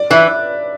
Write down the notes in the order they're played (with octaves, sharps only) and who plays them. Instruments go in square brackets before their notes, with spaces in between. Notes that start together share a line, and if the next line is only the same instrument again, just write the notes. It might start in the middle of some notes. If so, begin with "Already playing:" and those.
Already playing: [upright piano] D5
[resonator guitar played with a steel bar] E3 [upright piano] E5